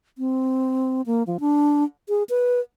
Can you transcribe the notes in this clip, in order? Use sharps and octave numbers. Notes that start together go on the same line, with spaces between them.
C4
A#3
F3
D4
G#4
B4